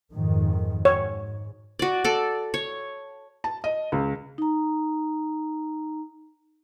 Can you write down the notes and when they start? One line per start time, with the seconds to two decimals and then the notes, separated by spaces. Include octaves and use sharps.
0.12 F2 G#2 D#3
0.85 G#2 C#5
1.79 F#4 D5
2.04 A4 D5
2.54 C#5
3.44 A5
3.64 D#5
3.92 C#2
4.38 D#4 A#5